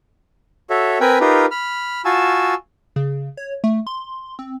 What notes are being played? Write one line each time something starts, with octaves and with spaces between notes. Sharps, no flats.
F#4 A4 C#5 E5
C4 A#4 B4 G5 G#5 B5
D#4 F4 G4 A#4 B4
B5 F6
F4 F#4 G#5 A5 E6
C#3
C#5
A3
C6
C4